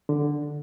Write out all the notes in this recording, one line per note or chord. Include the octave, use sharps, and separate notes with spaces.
D3